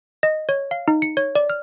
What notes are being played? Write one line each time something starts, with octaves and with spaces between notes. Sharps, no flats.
D#5
C#5
F5
D#4
C#7
C#5
D5
F6